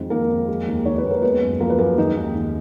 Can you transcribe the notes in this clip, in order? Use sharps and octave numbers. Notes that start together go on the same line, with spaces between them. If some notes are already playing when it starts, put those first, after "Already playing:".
Already playing: F2 D#3 G#3
D#3 A#3 A#4
F2
G#3
D#2
D#3 C#5
B4
D#2
A#4
G#3 B3 B4
F#2
F3 A#3 A#4
B4
F#2 A#3 A#4
D#3 G#3 D#4
D#2
D#3